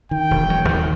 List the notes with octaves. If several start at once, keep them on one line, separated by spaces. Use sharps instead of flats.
D#3 G5
E1
F#3
D#2